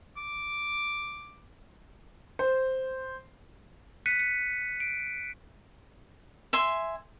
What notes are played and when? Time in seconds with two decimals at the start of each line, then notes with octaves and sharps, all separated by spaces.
0.17 D6
2.39 C5
4.06 F#6 B6 C#7 D#7
4.19 C#7
4.80 D7
6.53 E5 G#5 C6